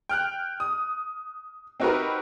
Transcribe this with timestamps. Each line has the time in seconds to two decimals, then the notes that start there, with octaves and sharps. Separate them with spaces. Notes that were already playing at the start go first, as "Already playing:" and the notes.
0.09 G5 F6 F#6
0.60 D#6
1.80 C4 D#4 F#4 G4 A#4 B4